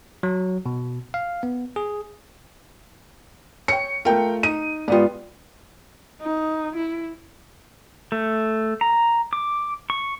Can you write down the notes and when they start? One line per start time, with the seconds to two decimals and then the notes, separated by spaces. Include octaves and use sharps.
0.23 F#3
0.66 B2
1.14 F5
1.43 B3
1.76 G#4
3.68 C#5 G5 C#7
4.05 A3 F4 A#4 G5
4.43 D#4 D#7
4.88 G#2 B3 F4 G4 D5
6.21 D#4
6.76 E4
8.12 A3
8.81 A#5
9.33 D6
9.90 C#6